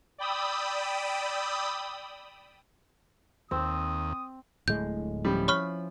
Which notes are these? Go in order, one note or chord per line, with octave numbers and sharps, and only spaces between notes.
D5 G5 B5 D#6 E6
D#2 C4 D#6
D1 A2 G#3 G6
F3 G3 C#4 E4
C#5 B5 C#6 F6